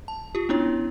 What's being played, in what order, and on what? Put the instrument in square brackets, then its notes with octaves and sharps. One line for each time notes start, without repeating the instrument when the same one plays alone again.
[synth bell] A5
F4 G4
B3 C#4 D4 E4 C#5